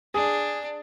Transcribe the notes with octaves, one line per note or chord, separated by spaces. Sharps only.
D4 G#4